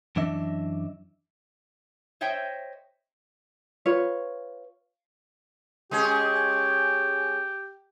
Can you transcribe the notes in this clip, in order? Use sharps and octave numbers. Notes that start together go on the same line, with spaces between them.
F#2 E3 D4 D#5 E5
C5 C#5 D#5 E5 G5
F4 B4 C#5
G#3 C#4 G4 G#4